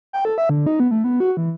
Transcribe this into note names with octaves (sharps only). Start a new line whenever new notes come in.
G5
A4
E5
D3
D#4
B3
A3
B3
F#4
E3